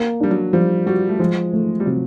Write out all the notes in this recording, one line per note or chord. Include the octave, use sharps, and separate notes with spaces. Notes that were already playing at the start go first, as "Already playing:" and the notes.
Already playing: A#3
G3 D4
F#3
F3 G3
G3 F#4
A3
F3 G#3
A3
G3
C3 F#3